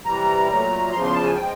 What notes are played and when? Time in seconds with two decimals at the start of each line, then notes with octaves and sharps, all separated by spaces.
0.05 C3 E3 G3 A#5
0.49 A#2 F#3 A3
0.92 E2 C#3 F3 C6
1.03 C6
1.13 A5
1.24 G#5
1.35 F3 G#3 G5